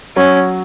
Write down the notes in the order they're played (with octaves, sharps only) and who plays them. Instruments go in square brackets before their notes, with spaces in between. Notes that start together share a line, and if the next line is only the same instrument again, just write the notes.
[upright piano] F#3 [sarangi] C#4